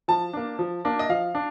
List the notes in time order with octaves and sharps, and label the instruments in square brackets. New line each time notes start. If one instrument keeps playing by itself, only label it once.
[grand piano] F3 A5
A#3 D4
F3
A#3 D4
D#5
F3 F5
D4